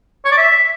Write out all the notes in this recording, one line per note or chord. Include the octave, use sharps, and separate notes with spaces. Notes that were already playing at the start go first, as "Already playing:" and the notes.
C#5
D5
E5